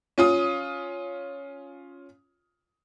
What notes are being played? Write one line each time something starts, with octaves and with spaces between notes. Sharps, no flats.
C#4 F4 D#6